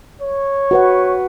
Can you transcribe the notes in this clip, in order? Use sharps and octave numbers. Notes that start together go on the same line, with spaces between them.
C#5
F#4 B4 F#5